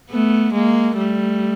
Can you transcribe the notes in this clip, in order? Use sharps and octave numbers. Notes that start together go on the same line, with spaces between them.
A3 B3
G#3 A#3
G3 A3